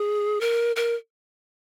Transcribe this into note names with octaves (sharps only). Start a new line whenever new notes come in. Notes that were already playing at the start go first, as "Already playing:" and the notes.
Already playing: G#4
A#4
A#4